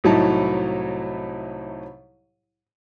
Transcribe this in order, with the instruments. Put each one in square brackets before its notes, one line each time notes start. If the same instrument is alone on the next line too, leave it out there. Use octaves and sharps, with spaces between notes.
[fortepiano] C2 A2 F#3 D#4 E4 A5